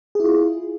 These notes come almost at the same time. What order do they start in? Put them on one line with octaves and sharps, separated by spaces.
G#4 E4 F4